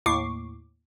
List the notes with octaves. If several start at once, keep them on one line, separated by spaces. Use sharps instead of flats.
D#2 A2 C#6 D6 C7